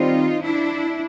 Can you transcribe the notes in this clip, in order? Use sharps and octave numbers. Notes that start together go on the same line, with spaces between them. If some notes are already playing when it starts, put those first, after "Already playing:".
Already playing: D#3 G3 C4 D#4 F4
D4 E4